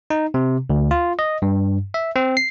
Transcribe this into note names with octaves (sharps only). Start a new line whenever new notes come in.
D#4
C3
D2
F4
D#5
G2
E5
C4
C7